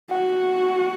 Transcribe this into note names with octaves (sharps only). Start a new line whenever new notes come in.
F#4 F#5